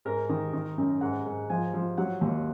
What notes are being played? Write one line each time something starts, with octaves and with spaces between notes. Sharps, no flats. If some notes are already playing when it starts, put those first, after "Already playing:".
G#2 A#4
D#3
D#3
F#2
G#2 F#5
G#2
F3 G#5
F3
F#3 F#5
D#2